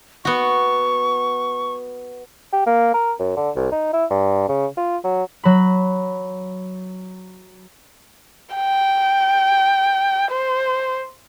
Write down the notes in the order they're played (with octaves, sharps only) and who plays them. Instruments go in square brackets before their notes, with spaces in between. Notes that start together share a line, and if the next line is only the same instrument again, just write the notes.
[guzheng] B3 F#4 [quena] C#6
[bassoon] G4
A#3
A#4
F#2
D3
C2
D#4
E4
G2
C#3
F4
F#3
[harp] F#3 B5
[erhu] G5
C5